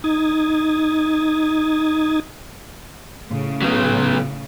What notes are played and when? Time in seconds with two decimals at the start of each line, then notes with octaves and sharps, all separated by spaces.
0.04 D#4 D#6 G#6 A6
3.28 A2 C#3
3.62 F#3 B3